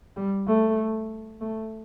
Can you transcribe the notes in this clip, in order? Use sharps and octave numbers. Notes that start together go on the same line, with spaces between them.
G3
A3
A3